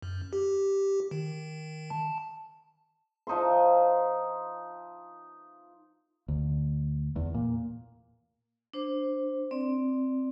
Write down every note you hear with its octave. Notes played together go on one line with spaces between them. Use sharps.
F#2
G4
D#3
A5
F3 D#4 E5 C6
D2
E2
A#2
D4 C5
C4 D5